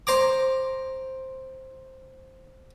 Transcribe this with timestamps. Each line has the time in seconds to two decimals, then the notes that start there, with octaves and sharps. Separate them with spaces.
0.07 C5 A#5 D6